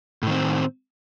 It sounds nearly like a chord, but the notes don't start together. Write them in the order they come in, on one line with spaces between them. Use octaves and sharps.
A2 D#3 C4